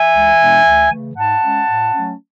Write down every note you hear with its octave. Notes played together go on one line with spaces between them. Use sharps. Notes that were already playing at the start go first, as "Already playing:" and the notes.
Already playing: E5 G#5
C#2
B2 G#3 B3 D4
D2
C#3 E3 A3
G#2 F#5 A5
G#3 C#4
A2
F#3 A3 C#4